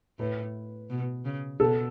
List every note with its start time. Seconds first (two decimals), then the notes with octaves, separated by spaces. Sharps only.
0.19 A2 B4
0.90 B2
1.25 C#3
1.60 B2 A4